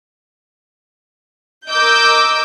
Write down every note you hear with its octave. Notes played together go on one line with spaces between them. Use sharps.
A#4 D#5 D6 E6 G6